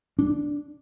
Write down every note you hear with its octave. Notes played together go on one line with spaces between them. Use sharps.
D4